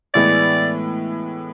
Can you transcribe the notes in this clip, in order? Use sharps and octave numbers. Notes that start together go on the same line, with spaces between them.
A2 E3 G#3 B3 D5